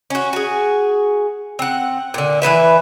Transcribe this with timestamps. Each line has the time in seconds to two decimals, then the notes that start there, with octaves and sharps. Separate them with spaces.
0.10 C#4 F#4
0.33 F#4 G#4
1.59 C4 F#5
2.14 A#2 D3
2.42 E3 A#3 B4 E5